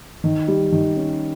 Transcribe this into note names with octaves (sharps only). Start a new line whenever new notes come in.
D#3
G3
D#3
C#4